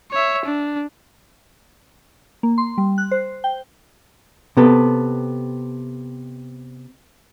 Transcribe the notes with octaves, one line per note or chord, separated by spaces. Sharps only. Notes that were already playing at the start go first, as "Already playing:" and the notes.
C#5 E5
D4
A#3
C6
G3
F#6
C5
G5
C3 B3 A4